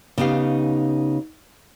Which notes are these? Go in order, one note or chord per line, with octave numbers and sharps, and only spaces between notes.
C#3 B3 D#4 G4 F5